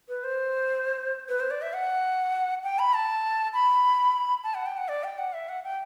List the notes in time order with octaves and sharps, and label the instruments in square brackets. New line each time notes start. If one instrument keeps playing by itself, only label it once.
[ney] B4
C5
B4
C5
D5
E5
F#5
G5
B5
A5
B5
A5
F#5
G5
F#5
D5
G5
F#5
E5
F#5
G5